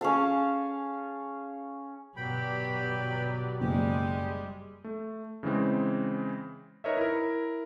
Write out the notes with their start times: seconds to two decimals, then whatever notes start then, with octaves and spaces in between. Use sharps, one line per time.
0.01 C#4 G#4 F5 A5
2.17 G1 B2 F#3 G4 B4 D5 G5 B5
3.61 F#1 G3 G#3 G4
4.84 A3
5.43 C#3 E3 G#3 C4
6.84 D#4 A#4 B4 C#5 D#5 E5
6.97 E4 A#4